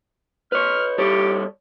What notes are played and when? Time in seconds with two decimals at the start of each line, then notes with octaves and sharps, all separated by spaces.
0.52 B4 C#5 F6
0.98 G3 G4 A4 C#5